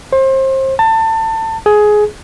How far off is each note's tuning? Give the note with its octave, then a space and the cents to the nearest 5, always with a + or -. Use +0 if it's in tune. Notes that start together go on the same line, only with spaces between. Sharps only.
C5 +30
A5 +25
G#4 +15